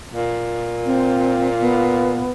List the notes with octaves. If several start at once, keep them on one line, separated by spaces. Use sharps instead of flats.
A#2
C4
B3